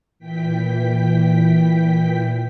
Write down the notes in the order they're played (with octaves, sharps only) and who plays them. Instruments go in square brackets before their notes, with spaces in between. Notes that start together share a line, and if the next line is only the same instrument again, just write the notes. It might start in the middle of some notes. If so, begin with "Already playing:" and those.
[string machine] A#2 E3 G5 B6